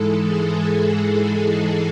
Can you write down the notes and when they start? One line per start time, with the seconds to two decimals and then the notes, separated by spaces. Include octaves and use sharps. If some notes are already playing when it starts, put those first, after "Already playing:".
Already playing: G#2 E3 G#3 A4
0.19 G#4
0.50 A4
0.80 A4